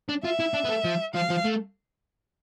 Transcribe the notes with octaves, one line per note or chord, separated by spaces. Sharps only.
D4
F4 E5
E4
D4
B3
A3
F3
F3 F5
F3
A3